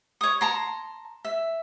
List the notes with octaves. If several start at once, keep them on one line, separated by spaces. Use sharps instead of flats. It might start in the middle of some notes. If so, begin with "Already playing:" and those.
C#5 D#6
A5 A#5 C6
E5